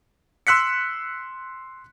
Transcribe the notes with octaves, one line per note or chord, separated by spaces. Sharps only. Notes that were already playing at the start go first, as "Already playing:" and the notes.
C6 E6 F#6 B6 C#7